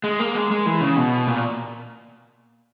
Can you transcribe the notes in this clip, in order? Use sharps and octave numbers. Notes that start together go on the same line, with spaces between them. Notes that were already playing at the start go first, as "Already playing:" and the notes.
G#3
A#3
G#3
G#3
E3
C#3
B2
A#2